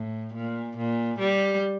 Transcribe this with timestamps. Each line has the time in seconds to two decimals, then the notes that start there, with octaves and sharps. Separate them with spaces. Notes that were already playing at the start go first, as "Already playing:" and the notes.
Already playing: A2
0.34 A#2
0.77 A#2
1.19 G3